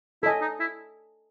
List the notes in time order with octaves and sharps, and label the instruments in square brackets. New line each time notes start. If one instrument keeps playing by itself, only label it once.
[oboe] E4 [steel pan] A4
[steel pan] D#5 G#5
[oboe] D#4
E4